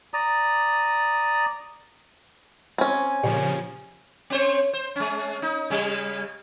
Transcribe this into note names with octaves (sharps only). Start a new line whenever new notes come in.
D5 A#5 D#6
C4 C#4 G#5
A#2 C#3 F3 G4 C#5
C4 C5 C#5
C5
G#3 C#4
D#4
C#3 G3